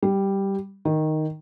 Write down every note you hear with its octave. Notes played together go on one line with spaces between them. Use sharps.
G3
D#3